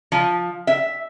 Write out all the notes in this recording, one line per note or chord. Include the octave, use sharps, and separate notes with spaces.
F3
E5